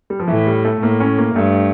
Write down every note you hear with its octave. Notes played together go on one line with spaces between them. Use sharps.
G3
F3
A2 E3
G3
A3
A2 A#3
C#4
A#3
G2 A3